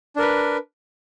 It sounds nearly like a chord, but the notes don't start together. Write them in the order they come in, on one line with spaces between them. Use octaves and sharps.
D4 A#4 B4